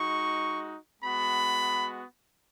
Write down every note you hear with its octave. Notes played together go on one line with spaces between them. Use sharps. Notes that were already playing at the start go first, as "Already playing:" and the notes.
Already playing: G#3 D#4 F#4 C#6
G#3 B3 F#4 B5